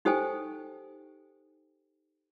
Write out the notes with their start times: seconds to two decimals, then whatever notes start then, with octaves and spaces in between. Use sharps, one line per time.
0.05 D#4 G4 A4 C5 G5 G#5